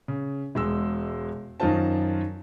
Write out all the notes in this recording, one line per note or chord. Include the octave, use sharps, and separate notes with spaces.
C#3
E1 G#3 E6
F#2 D#3 D#4 F4 C5 A5